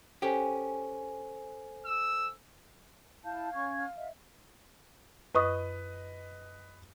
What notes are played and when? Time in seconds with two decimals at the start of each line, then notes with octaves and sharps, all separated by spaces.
0.22 C#4 G4 A4 C5 G#5
1.85 E6
3.25 E4 F5 A5 G6
3.53 C#4 C#6 G#6
3.96 D#5 E5
5.35 F#2 B4 D#5 C#6 D#6